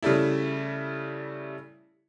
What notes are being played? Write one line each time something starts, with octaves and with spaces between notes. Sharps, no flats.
C#3 G3 A3 E4